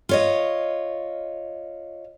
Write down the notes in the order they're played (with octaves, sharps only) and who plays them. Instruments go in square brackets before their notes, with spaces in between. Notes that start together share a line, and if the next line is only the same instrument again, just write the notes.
[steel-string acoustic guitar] F4 C#5 D#5